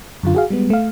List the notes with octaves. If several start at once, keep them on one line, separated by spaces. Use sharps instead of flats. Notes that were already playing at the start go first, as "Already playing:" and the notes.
F#2 D3 F4
F#4 G#4 F5
G3 G#3 B3
A3 F5